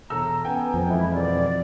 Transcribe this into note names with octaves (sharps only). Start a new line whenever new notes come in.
E1 A4 A#5 E6
B3 C#4 G5 G#5
F2 C5
E3 G#3 E4
E2 G#2 B2 D5